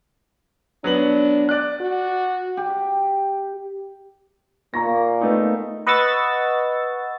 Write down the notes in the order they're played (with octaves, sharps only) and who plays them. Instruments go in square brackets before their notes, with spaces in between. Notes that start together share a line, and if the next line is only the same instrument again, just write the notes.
[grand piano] F#3 B3 F#7 [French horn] D4
[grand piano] D5 F#6
[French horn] F#4
[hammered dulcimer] G4
[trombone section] A#2 A#3 [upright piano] A#5 C#6 A#6
[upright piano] A3 B3 D#4
[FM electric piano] B4 D#5 F#5 C#6 E6 A6